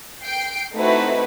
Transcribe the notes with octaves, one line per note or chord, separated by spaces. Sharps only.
G5 C7 D7
A3 C4 D#4 E4 F#4 B4